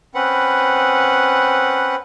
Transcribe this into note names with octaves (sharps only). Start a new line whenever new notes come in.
C4 C#4 B4 F#5